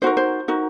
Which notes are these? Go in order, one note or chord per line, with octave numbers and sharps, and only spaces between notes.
D#4 F#4 A#4 C5
C5
D#4 F#4 A#4